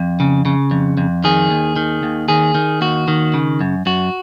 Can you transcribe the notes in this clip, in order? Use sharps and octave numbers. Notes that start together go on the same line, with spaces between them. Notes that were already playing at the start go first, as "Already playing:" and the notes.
Already playing: F2
C#3
C#3
F2
F2
D#3 G#4
D#2
D#3
D#2
D#3 G#4
D#3
D#2 F#4
D#3
C#3
F#2
F#2 F#4